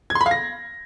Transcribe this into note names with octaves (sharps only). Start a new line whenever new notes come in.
G#6
C6
B5
F5
A#6